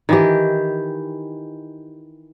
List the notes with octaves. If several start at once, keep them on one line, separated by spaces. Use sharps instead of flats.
D#3 E3 G4